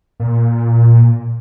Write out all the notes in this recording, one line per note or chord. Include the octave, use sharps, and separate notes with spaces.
A#2